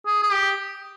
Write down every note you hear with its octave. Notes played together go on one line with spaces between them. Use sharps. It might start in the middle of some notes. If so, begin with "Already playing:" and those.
G#4
G#4
G4